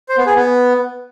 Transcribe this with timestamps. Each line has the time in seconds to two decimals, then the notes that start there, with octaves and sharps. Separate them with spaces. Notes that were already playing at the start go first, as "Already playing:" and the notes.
0.09 C5
0.18 B3
0.26 G#4
0.35 B3